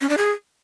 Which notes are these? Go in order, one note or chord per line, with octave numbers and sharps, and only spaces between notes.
C#4
D4
G#4